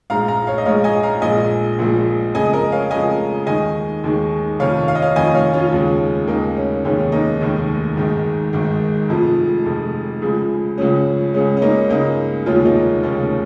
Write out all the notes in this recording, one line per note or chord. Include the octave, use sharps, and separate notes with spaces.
A#1 G#2 G#3 F5 A#5
F5 A#5
C#5 F5
D#5
A#1 G#2 G#3 C#5 F5
D#5 G#5
F5 A#5
A#1 A#2 F3 G#3 D#5 G#5
A#1 A#2 F3 G#3
F2 C#3 G#3 D#5 G#5
A#4 D#5
C#5 F5
F2 C#3 G#3 D#5 G#5
D#2 D#3 G#3 D#5 G#5
D#2 D#3 G#3
F1 F2 D#3 C#5 F5
F5
D#5
C#5 F5
F1 F2 D#3 D#5 G#5
C#5 F5
C#4 F4
D#2 C#3 G#3
D#2 C#3 G#3 A#3 D#4
C#4
F1 D#2 D#3 G#3 C#4
A#3 D#4
F1 D#2 D#3 G#3
G#1 G#2 D#3 G#3
G#1 G#2 D#3 G#3
F1 F2 F3 G#3
F1 F2 F3 G#3
C#2 C#3 F3 G#3
C#2 C#3 F3 G#3 C#4
C#2 C#3 G#3 C#4
C#4
A#3 D#4
C#2 C#3 G#3 A#3 D#4
F1 D#2 C#3 G#3 C#4 F4
A#3 D#4
F1 D#2 C#3 G#3 C#4